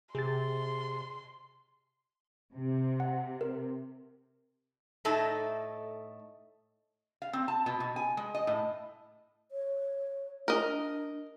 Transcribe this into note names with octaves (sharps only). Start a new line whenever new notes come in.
C3 G#4 C6 A6
C3
F#5
A#4
A2 A3 D#4 A4
F5
C4
A5
B2
B2
G#5
G#3
D#5
A2
C#5
D4 A#4 D#5